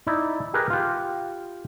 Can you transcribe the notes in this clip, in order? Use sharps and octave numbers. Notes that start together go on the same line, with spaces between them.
D#4 E4 D5
G4 G#4 A#4 B4
F4 G4